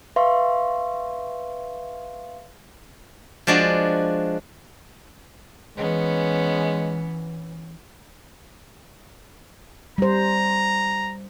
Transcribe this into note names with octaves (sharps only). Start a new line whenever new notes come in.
B4 E5 F5 C6 C#6
F3 G#3 D4 F#4 D5
E3 G#3 B3 C#4
G3 C5 A#5